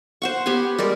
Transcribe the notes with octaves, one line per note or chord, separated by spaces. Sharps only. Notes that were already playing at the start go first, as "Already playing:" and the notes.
C5 F#5 C#6
B3 G4 B4 G#5
G3 G#3 A#4 D5